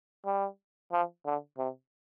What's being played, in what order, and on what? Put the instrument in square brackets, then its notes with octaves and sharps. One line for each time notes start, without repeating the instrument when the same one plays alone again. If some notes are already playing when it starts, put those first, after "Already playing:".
[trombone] G3
F3
D3
C3